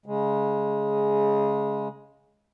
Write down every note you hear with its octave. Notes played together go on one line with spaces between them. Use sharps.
C#3 G#3